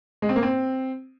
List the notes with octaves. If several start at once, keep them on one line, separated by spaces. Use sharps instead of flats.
G#3
C4
A#3
C4